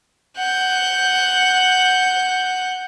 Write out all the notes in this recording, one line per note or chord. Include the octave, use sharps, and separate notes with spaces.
F#5 G6